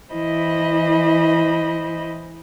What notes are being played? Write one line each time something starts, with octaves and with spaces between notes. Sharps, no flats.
E3 E4 C5 D#5 B5